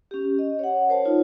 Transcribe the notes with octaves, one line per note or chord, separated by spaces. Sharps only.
C#4 G4
D#5
C#5 F#5
A#4 C5 C#5 A5
D#4 F4